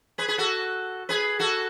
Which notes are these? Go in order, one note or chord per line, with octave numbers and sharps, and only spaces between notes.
G#4 B4
G#4 B4
F#4 A4
G#4 B4
F#4 A4